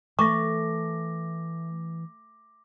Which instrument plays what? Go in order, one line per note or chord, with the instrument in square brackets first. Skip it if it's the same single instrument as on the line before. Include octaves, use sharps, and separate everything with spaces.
[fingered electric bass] E3 [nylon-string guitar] A3 [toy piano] C#6 [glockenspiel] D6 A#6